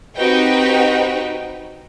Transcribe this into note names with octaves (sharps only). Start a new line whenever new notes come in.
C4 D#4 F#4 G4 B4 G5